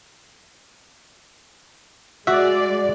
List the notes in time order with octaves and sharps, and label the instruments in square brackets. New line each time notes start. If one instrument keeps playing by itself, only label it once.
[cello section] G#3 D5 [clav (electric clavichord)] F#4 E5